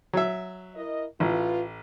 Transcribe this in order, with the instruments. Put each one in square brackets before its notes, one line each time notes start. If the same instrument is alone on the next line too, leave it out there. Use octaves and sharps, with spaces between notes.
[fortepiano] F#3 E5
[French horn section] E4 A#4 D#5
[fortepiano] A1 [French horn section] F4 B4